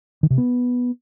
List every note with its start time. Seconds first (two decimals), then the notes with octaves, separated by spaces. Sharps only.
0.23 D#3
0.30 C3
0.38 B3